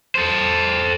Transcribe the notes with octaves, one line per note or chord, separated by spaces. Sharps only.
A4 C5